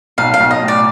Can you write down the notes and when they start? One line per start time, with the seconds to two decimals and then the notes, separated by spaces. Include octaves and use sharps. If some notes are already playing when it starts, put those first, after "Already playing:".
0.18 B1 F5
0.34 F5
0.40 B1
0.51 D#5
0.62 A2
0.68 D5